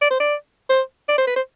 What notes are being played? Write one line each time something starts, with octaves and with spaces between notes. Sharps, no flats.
D5
C5
D5
C5
D5
C5
B4
C5